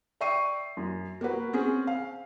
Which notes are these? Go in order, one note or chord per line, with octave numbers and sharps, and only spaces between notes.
D5 E5 G5 C#6 C7 D#7
F#2
A#3 F#4 B4
C4 C#4 G#4
F5